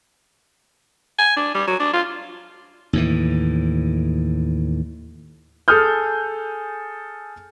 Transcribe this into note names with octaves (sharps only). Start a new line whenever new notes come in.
G#5
D4
G3
F#3
D4
F4
D#2 A2 E3
G#4 A4 G#5 D#6 F6 G6